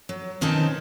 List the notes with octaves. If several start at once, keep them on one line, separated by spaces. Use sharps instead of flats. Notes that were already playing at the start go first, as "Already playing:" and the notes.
F#3
B2 D#3 C4 C#4 D#4 A5